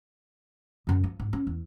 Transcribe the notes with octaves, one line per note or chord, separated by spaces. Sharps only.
F#2 D3
F3
G#2
C#4
E2